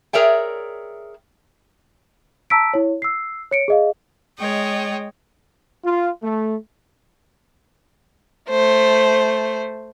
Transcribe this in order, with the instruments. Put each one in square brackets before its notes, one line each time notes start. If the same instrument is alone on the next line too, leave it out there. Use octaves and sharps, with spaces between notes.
[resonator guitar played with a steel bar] G#4 A#4 C#5 D5 E5 G5
[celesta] A5 A#5 E6 B6 D7
E4 C#5
E6 C7
C#5 C#7 D7
G#4 D#5 F5
[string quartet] G#3 C#5 D#5 G5
[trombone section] F4
A3
[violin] A3 C5